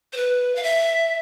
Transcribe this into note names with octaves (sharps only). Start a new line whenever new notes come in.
C5
B4
F5
E5